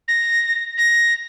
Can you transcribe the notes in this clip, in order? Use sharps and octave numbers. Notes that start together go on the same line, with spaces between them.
A#6
A#6